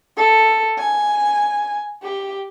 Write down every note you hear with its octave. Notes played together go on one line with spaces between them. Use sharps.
A4
G#5
G4